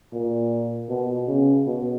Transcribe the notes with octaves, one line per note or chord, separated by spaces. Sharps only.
A#2
B2
C#3
B2